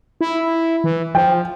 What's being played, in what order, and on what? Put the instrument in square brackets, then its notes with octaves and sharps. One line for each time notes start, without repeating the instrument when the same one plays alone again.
[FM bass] E4
E3
[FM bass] F3 [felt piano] G5